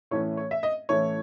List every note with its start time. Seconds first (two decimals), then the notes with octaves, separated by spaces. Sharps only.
0.11 A2 E3 A3 C#4 C#5
0.37 C#5
0.51 E5
0.63 D#5
0.89 A2 E3 A3 C#4 C#5